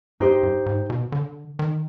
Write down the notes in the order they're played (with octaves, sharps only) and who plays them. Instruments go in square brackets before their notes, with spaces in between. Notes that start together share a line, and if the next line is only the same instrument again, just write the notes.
[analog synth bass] G2 [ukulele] D#4 G4 C5
[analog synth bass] G2
G#2
B2
D3
D#3